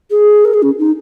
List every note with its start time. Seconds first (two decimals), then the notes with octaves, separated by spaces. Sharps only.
0.10 G#4
0.45 A#4
0.53 G#4
0.62 C#4
0.78 D#4